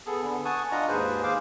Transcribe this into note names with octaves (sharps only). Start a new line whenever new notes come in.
B3 G#4 A4
D3 B3
F#5 G#5 A5 C#6 D#6
D4 F4 D5 D#5 F#5 A#5
D#2 G#2 G#4 B4 C5
D#2 G#4 C5 F5 D6